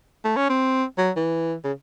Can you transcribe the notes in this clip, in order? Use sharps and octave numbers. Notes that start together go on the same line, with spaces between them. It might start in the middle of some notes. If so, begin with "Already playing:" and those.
A3
C#4
C4
F#3
E3
C#3